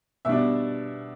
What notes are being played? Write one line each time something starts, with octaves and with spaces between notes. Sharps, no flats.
B2 G3 D4 E5